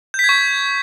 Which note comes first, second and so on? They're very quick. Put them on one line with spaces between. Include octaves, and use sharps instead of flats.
G6 B6 G#6 C#6